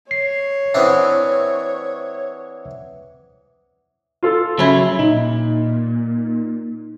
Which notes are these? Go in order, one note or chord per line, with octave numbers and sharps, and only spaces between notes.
C#5 C7
E3 C4 D4 E5 F#5 D#6
F4 A4
C#3 F#3 E4
A#2 D#4